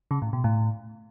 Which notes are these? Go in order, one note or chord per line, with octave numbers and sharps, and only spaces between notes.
C#3
A2
B2
A2